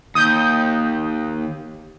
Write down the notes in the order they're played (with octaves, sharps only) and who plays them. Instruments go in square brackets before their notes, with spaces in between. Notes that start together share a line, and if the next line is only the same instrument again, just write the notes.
[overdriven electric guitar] D#2 [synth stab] D#6 G6